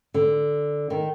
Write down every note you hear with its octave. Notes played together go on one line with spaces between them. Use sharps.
D3
D#3